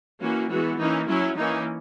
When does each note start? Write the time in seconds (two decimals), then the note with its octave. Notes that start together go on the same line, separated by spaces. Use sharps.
0.21 E3 A#3 C#4 F#4
0.50 E3 G#3 B3 F#4
0.80 E3 A#3 C#4 D#4
1.08 F#3 C#4 E4
1.37 E3 A#3 C#4 D#4